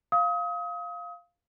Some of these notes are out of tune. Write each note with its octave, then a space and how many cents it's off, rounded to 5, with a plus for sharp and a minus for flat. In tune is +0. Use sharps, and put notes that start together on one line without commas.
F5 +0 D#6 +35